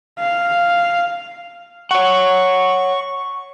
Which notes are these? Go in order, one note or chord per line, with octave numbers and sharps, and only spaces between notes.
F5
C#5 F#5 C#6